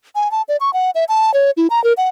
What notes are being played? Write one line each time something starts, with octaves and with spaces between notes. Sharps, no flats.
G#5
A5
D5
C#6
F#5
E5
A5
C#5
E4
A#5
A#4
F#5